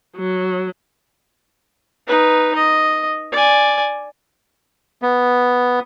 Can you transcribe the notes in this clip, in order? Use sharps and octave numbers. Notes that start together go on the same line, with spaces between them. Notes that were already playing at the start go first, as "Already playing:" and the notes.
F#3
D#4 B4
D#5
D5 G#5
B3